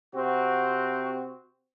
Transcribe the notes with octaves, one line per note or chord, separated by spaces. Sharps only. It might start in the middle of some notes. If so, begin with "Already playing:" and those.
C3 C4 F#4